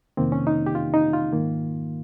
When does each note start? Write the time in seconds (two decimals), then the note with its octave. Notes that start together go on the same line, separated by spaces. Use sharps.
0.17 F2 C3 D#3 A#3 C4
0.32 C#4
0.47 D#4
0.66 G4
0.75 F4
0.94 D#4
1.13 F4
1.32 G#2 D#3 A#3